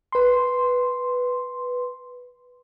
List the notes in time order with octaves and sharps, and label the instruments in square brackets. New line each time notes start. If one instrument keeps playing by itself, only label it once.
[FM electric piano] B4 C6